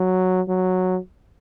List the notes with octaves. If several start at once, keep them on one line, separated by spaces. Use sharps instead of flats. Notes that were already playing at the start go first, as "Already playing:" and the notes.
Already playing: F#3
F#3